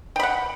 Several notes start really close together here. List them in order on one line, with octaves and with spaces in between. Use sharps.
G5 B5 F#5